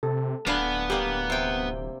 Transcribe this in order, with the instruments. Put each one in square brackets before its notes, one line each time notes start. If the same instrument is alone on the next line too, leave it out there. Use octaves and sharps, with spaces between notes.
[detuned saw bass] C3 [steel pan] A4
[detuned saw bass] D1 [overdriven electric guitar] B3 B5 [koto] D4 F5 G#5
[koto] G3 A#3 [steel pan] G4
[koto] C3 G5